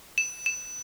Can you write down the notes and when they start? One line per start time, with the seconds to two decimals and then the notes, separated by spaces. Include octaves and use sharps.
0.18 E7
0.46 E7